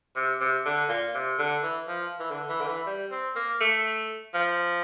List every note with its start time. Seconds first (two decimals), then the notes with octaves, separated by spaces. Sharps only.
0.16 C3
0.40 C3
0.65 D3
0.89 A#2
1.15 C3
1.39 D3
1.63 E3
1.88 F3
2.19 E3
2.31 D3
2.49 E3
2.61 D3
2.67 E3
2.86 G3
3.11 C4
3.35 A#3
3.60 A3
4.34 F3